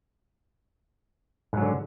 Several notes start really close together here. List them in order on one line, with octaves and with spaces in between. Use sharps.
G#2 F#3 D3